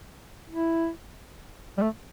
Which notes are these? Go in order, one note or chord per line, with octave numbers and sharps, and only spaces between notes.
E4
G3
A3